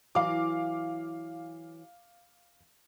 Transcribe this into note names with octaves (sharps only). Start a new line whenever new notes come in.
E3 F#3 F5 D6